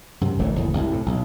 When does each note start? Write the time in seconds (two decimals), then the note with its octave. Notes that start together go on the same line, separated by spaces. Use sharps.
0.21 F#2 C3
0.38 D1 A1 A#2 A3
0.56 F#1 E2 A2
0.73 C2 F#2
0.92 A2 C3
1.06 B1